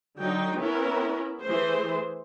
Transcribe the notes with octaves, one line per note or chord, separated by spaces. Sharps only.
D3 F#3 D#4 G5
B3 C#4 E4 A#4
E3 A3 G#4 C5